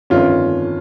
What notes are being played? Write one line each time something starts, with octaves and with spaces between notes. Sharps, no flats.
G1 F2 D#3 C#4 F4